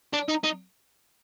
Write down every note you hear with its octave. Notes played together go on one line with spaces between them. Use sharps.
D4
D#4
D#4